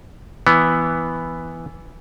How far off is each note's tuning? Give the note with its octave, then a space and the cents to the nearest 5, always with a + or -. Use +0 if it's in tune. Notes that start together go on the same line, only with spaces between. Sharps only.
E3 +0 B3 +0